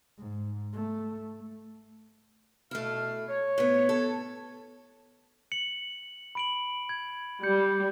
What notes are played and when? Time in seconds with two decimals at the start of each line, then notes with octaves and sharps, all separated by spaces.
0.18 G#2
0.73 A3
2.71 B2 A3 E4 F5 F6
3.29 C#5
3.58 A2 B3
3.89 A4
5.52 C#7 F#7
6.35 B5 D7 F#7
6.89 G#6
7.43 G3 G6 C#7